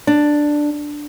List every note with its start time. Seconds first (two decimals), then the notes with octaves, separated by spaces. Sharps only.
0.07 D4